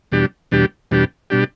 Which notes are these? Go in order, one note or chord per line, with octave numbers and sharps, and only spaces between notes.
E2 B2 G3 D4 G4
E2 B2 G3 D4 G4
E2 B2 G3 D4 G4
B2 G3 D4 G4